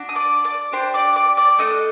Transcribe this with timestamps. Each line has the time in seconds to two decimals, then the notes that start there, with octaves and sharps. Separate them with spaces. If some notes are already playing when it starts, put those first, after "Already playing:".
Already playing: D4 F#4
0.09 D#6
0.15 D5 D6
0.44 D5 D6
0.72 D4 G4 C5 C6
0.94 D5 D6
1.15 D5 D6
1.37 D5 D6
1.58 A3 D4 A4 D#5 D#6